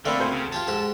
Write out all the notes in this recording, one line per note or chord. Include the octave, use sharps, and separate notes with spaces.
D3 A3 A#3 C4 D5 F5 B5
D2 A2 C5 C#7
C#3
F4 G4 C#5 A5
G#2 F#4 G4 A4